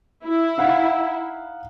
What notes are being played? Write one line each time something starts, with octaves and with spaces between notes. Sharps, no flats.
E4
D#4 F5 F#5